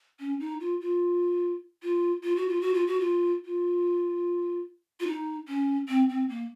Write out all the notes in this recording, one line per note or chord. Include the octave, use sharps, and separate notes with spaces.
C#4
D#4
F4
F4
F4
F4
F#4
F4
F#4
F4
F#4
F4
F4
F4
D#4
C#4
C4
C4
A#3